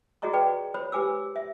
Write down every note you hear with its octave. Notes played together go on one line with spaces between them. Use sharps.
F#4 G#4 D5 D#5 A#5 C#6
G#4 B4 D5 G5
C5 C#5 B5
G4 B4 G#5 D6 E6
E5